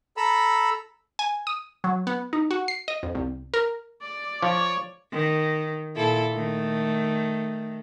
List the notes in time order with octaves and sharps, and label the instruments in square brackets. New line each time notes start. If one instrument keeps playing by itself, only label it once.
[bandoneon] A4 A#5 B5 E6
[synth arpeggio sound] G#5
D#6
F#3
B3
D#4
F#4
C7
D#5
F2
C2
A#4
[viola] D5
[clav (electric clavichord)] F3 [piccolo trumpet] C#5
[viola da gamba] D#3
A#2 E4 A4
D#3 A3